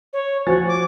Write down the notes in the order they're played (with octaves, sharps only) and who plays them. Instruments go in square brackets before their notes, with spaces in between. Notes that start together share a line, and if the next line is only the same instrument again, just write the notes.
[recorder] C#5
[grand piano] F3 G#5 A6 [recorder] F#4
[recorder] D6